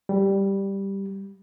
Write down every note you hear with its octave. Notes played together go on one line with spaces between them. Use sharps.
G3